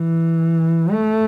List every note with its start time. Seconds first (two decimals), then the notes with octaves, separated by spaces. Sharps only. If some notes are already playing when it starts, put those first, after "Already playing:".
Already playing: E3
0.92 A3